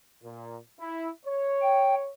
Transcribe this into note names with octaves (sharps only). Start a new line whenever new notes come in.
A#2
E4
C#5
G5